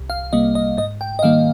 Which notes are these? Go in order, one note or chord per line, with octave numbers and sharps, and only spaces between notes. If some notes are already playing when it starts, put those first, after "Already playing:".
Already playing: C2
F5
C3 G3 A#3 D#5
D#5
G#2 D#5
G5
D#5
D#3 G3 A#3 F5